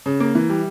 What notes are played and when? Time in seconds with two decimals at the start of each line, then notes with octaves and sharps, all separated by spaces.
0.06 C#3
0.20 A#3
0.35 E3
0.49 G3